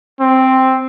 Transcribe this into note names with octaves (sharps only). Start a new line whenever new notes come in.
C4